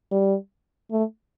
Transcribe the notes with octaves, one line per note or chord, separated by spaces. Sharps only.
G3
A3